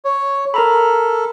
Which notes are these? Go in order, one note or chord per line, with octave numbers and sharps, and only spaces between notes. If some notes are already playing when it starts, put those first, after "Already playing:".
C#5
A4 A#4 A#5 B5